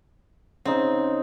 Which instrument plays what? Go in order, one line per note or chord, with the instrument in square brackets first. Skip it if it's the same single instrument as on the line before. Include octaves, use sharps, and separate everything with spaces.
[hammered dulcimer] C#3 D#4 [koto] C4